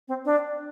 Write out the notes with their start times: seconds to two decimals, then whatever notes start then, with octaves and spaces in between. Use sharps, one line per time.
0.08 C4
0.25 D4